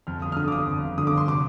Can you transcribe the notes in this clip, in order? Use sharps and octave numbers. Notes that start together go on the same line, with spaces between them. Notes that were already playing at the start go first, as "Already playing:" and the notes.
F2 F6
G1 D#6
F6
D3 D#6
D6
G1 D#6
F2
G1
D3 D#6
D6
G1 C6
C3 D6